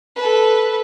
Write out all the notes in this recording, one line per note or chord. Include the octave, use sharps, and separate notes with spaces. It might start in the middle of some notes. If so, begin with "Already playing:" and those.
A4 B4